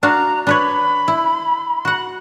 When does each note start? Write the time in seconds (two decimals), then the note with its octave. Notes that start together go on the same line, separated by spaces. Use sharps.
0.03 D4 F#4 F5 A#5
0.47 D4 B4 C#5 B5
1.08 E4
1.85 F#4 F#5